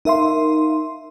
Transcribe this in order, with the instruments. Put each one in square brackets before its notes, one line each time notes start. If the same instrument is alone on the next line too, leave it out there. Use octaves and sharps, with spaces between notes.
[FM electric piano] D#4 A#4 E5 F5 C6